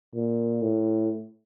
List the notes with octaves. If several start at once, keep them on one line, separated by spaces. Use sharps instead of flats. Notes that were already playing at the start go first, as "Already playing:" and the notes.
A#2
A2